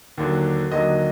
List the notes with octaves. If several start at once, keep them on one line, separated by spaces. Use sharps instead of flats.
D#2 D3 F#3
D#2 D3 F#3 D#5